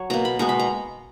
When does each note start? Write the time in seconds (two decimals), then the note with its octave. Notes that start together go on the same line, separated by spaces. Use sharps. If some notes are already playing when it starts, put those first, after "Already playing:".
Already playing: F#3 C#5
0.10 B2 A#3 A#5
0.25 B5
0.39 B2 G#3 B3 A#5
0.49 B5
0.59 A#5